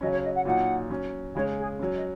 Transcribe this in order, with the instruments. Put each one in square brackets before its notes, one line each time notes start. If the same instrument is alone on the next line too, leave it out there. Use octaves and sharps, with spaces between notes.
[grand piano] C#3 F#3 C#4 [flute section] D#5
[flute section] C#5
D#5
F#5
[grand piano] A#2 F#3 D#4 [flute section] F#5
[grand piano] F#3 C#4
[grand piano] C#3 G#3 C#4 [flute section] C#5
[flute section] G#4
[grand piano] F#3 C#4 [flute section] C#5
[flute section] D#5